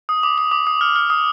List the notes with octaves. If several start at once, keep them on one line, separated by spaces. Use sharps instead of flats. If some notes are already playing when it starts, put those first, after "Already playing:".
D#6
D6
D#6
D6
D#6
F6
F6
D#6